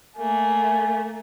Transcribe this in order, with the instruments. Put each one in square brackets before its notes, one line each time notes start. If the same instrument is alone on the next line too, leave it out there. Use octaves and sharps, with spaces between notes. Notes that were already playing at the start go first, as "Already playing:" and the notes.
[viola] A3 A#3 [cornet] G#5